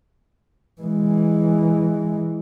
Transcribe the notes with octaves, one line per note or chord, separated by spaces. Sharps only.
E3 G#3